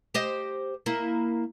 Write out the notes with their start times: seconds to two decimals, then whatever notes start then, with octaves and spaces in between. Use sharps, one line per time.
0.14 G4 C5 D#5
0.86 A#3 E4